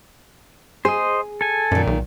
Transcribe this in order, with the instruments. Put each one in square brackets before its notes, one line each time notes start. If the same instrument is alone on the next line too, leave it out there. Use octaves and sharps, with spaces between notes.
[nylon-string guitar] G#4 [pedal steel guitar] C5 D#5
[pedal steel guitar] A4 G#5
[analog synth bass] F#2 [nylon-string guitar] A#2 D#3
[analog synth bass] B1